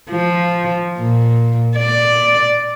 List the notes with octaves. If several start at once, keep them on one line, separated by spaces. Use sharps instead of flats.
F3
A#2
D5